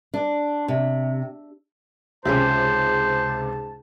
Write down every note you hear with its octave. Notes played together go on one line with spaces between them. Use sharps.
D4
C3
C#2 G#2 C3 C#4 F4 G4 C5 A5